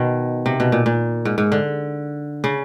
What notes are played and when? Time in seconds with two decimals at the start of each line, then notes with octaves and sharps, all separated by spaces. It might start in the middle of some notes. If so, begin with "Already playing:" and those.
Already playing: B2 D#3
0.46 C3
0.60 B2
0.72 A#2
0.86 A#2
1.25 G#2
1.38 G#2
1.52 D3
2.44 C#3